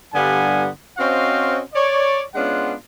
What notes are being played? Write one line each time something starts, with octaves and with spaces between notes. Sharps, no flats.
G2 D3 G3 B3 F5 G#5
C4 C#4 F#4 C5 D#5 F5
C#5 D5
G#3 B3 C#4 D4 F4 F#5